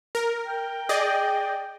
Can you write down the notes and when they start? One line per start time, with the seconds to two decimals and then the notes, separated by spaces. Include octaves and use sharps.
0.15 A#4
0.46 G5
0.89 G#4 D5 D#5